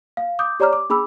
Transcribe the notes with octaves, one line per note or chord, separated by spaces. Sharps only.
F5
D6 D#6 G6
G4 C#5 D5 A#5 D6 F6
D6
D4 G#4 B5 D6 E6